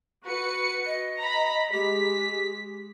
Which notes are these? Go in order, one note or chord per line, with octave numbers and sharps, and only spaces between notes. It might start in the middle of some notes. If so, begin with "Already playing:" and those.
F#4 B4 C#7
D#5
A#5 B5
G#3 G4 B6